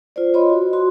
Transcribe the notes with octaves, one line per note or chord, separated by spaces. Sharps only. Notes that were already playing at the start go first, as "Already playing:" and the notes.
F4 C5 D5
F4 C#5 D#5 B5 C6
F#4
F#4 C6